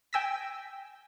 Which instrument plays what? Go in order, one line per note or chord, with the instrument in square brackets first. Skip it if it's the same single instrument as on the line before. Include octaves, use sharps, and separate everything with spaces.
[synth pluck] G5 G#5 E6 A#6 B6